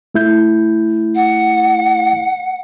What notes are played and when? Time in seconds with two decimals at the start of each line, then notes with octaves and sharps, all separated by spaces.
0.14 A3 E4 G6
1.15 F#5